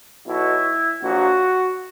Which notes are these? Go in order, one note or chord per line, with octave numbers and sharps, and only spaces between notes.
B1 B2 F#3 E4
A#1 A#2 F#3 F#4